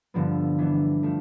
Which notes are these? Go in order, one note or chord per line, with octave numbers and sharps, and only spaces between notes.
G2 D3 F3 B3
E3 B3 D4
F3 A3